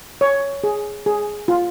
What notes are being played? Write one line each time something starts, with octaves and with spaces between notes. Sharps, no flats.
C#5
G#4
G#4
F4